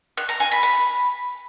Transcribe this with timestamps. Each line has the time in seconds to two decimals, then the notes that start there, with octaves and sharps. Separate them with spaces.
0.17 F#6
0.29 A#5
0.40 G#5
0.52 B5
0.63 B5